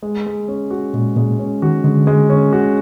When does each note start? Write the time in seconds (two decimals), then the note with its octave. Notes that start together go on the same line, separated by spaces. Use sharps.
0.03 G#3
0.26 G#3
0.48 C#4
0.70 F#4
0.94 A#2 G#3
1.16 A#2 G#3
1.39 C#4
1.62 D#3 F#4
1.84 D3 G#3
2.07 G#3
2.30 C#4
2.53 F#4